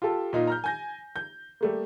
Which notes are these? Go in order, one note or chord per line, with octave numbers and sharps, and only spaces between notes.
F4 G4 A4 A5
A#2 D#4 F4
A#5 F6 G6
G#5 G6 A#6
G6
G3 A3 A#3